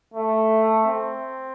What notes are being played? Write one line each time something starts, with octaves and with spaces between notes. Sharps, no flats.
A3
C4